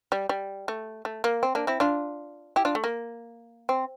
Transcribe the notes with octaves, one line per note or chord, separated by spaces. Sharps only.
G3
G3
A3
A3
A#3
C4
A#3 D4
C4 E4
D4 F4
E4 G4
D4 F4
A3
A#3
C4